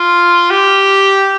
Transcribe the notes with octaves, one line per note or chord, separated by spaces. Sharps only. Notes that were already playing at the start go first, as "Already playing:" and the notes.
Already playing: F4
G4